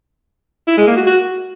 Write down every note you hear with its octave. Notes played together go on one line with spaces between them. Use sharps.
E4
G#3
A#3
F#4
F#4